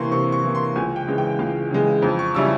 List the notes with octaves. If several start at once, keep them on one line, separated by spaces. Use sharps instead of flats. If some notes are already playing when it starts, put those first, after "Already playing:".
Already playing: C3 E3 A#3 C6 C#6
C3 C#6
C#6
E3 A#3
C6
C#2 G#5
G5
C#3 E3 G#3
G5
C#2 F5
C#3 E3 G#3
F2
C#6
C#3 G3 C#4 E4 E6